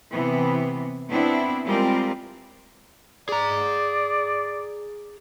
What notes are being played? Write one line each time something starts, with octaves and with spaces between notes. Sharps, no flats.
C3 E3 B3
B3 C4 D4 E4
G3 G#3 C4 F4 G4 A#4
G#4 D5 A#5